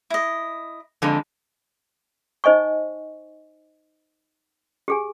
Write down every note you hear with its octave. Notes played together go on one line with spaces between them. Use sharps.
E4 D#5
F2 D3 G#3
D#4 C5 D#5 G#5 C#6
G4 G#4 G#5